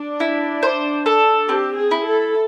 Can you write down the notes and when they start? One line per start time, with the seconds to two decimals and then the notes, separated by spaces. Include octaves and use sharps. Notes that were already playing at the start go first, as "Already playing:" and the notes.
Already playing: D4
0.20 E4
0.63 C5
1.06 A4
1.49 C4 G4
1.77 G#4
1.91 E4
2.06 A4